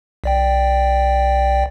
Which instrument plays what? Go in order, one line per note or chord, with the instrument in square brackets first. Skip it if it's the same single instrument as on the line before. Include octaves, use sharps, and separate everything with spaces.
[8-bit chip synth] B1 D5 G5